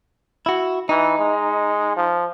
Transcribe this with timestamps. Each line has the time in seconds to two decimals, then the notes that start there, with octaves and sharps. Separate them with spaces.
0.46 E4 F#4
0.89 E3 D#4
1.19 G#3
1.96 F3